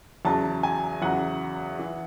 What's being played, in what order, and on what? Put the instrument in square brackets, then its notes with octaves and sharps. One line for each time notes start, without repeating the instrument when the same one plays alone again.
[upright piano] E2 C#3 F#3 A5
G#5
E2 C#3 F#3 F#5
E3